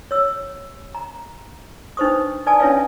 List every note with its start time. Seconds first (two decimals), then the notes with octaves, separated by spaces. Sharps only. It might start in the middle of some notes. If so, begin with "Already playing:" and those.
0.11 C#5 E6
0.95 A#5
1.97 D4 D#4 B4 C5 C#6 D#6
2.46 B4 D5 G#5 A5 D#6
2.60 C#4 D4 E4 B4 C#5 F5